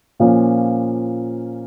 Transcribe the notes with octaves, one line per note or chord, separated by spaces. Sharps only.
A#2 F3 A#3 C#4